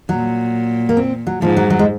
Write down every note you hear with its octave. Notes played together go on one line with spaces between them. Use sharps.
A#2 F#3
A#3
C4
F#3
G#2 F3
F#3
F#3
G#3